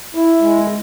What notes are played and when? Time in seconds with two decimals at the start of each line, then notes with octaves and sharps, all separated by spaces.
0.15 E4
0.42 G#3